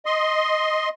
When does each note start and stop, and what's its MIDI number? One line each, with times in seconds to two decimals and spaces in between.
0.06 0.89 75
0.06 0.89 84